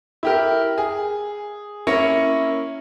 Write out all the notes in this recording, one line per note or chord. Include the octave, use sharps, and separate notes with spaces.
E4 G4 A#4
G#4
A#3 C#4 E4 A#6 C#7